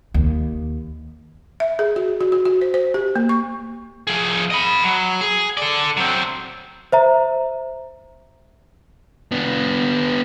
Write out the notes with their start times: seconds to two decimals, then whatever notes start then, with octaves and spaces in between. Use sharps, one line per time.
0.14 D#2
1.60 E5
1.79 G#4
1.96 F#4
2.21 F#4
2.32 F#4
2.45 F#4
2.61 C5
2.74 C5
2.94 G4
3.16 A#3
3.29 C#6
4.07 F3 G#4
4.50 D#5 B5
4.84 F#3
5.21 G#4
5.57 A4 D5
5.97 F#3 C4
6.92 C5 E5 A#5
9.32 B3 D4